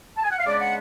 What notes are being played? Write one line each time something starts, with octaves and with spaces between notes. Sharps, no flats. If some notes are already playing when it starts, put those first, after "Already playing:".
A5
G#5
F#5
F5
C#3 G#3 B3 D4 D5
F#5